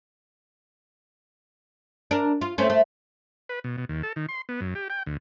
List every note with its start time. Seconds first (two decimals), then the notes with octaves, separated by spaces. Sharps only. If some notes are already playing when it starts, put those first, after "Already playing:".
2.11 D4 A#4
2.41 F4
2.58 A3 C4 C#4
2.70 A3
3.49 B4
3.64 B2
3.78 B2
3.89 D#2
4.03 A4
4.16 D#3
4.29 C6
4.49 B3
4.61 F#2
4.75 G4
4.90 G5
5.06 D2